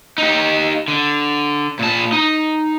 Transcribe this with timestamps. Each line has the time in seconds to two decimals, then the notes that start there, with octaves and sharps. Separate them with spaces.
0.18 D#4 G4
0.88 D3
1.79 A#2 A5
2.12 D#4